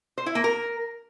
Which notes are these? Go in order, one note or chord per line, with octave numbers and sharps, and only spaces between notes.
C5
E4
A#3
A#4